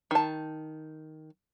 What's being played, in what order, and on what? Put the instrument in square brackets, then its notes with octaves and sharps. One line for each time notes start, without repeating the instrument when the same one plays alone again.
[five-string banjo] D#3 A5